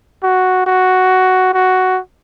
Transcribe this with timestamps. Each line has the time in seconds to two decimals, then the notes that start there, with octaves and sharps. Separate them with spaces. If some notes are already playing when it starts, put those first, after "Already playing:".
0.23 F#4
0.66 F#4
1.54 F#4